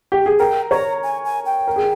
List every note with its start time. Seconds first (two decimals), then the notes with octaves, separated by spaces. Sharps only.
0.12 G4
0.26 G#4
0.39 A#4 G5
0.71 C#5 A#5
1.03 G#5
1.25 G#5
1.45 G5
1.67 A#4
1.76 G#4